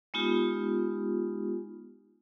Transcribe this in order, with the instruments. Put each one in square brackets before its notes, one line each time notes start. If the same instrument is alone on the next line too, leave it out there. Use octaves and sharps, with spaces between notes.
[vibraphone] G#3 B3 D#4 F4 G4